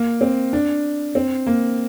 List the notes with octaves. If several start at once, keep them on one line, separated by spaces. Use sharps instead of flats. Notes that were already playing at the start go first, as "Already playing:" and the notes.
Already playing: A#3
C4
D4
C4
A#3